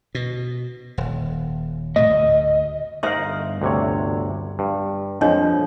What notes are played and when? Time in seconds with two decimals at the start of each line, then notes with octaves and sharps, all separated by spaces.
0.15 B2
0.98 D#1
1.96 A2 C3 A3 D#5
2.09 D2
3.03 G1 D#4 A#4 C5 E5 F5 C6
3.62 D2 C3 C#5
4.59 G2
5.21 F2 A#2 F3 G3 D4 C#5 D#5